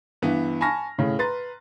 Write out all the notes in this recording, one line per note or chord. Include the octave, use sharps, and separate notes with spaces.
G2 E3 B3
G#5 A5 B5 C#6 F6 A#6
A2 C#3
B4 A#5 C6 A6